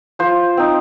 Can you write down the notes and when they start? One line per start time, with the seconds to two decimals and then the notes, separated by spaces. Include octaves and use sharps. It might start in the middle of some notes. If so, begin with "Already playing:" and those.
0.19 F3 C5
0.57 C4 D#4